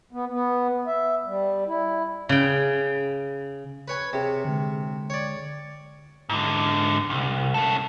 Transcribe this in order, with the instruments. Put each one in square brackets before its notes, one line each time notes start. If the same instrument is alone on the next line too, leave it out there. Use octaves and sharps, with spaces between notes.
[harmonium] B3
B3
E5
G3
E4
[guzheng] C#3 G5
[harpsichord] B4 C#5 G#5
[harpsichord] C3 [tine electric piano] G#4 C#5
[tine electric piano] D3 G#3
[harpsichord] C#5 D5
[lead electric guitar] G#2 D3
C2
C#4 A4